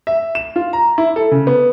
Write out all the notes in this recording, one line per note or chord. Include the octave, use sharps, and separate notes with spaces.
E5
E7
F4
A#5
E4
A4
C#3
B3